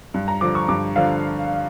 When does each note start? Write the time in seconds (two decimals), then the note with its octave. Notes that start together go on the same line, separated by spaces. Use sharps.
0.14 G2
0.28 A#5
0.41 D3 F3 D6
0.55 C#6
0.68 G2 D6
0.96 D3 F3 F5